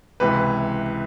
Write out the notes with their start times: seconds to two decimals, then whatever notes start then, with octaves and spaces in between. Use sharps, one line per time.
0.20 C#2 C3 E3 B4